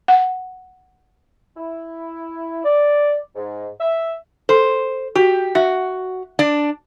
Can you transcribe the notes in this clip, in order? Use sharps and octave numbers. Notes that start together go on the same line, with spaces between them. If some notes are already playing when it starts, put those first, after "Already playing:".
F#5
E4
D5
G#2
E5
A4 C5
F#4 G4
F#4 E5
D4 D5